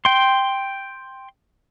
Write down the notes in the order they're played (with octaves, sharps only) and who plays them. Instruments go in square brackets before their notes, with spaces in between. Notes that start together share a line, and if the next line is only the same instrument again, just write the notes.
[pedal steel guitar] G5 C6